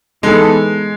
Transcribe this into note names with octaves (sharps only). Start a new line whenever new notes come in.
E3 G#3 B3 D#4 A4